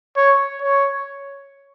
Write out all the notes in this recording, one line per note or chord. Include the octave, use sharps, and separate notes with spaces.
C#5
C#5